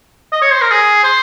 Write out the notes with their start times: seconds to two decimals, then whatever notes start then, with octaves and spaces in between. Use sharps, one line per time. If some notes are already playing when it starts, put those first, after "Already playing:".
0.32 D#5
0.42 C#5
0.52 C5
0.62 A#4
0.71 G#4
1.04 C5